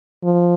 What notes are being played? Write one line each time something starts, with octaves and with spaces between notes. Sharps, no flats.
F3